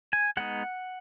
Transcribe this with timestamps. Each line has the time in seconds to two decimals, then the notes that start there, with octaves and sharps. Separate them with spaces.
0.13 G#5
0.37 G#3 B3 D#4 F#5